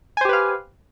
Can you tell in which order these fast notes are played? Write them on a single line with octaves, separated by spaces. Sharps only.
G#5 C5 G4 B4 F5